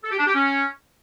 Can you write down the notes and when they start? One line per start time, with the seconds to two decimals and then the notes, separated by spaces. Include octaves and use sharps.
0.04 A4
0.11 G4
0.19 D4
0.27 G4
0.34 C#4